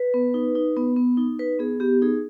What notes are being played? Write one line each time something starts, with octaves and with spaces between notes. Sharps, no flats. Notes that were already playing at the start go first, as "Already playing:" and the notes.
Already playing: B4
B3
D#4
D#4
B3
B3
D#4
D#4 B4
B3 G#4
B3 G4
D#4 G#4